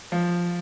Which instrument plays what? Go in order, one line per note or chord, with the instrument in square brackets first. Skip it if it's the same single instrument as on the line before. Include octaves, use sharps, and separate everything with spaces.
[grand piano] F3